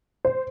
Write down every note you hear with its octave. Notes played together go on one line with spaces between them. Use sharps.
C5